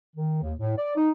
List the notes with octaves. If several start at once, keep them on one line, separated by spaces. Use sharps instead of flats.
D#3
D#2
A2
D5
D#4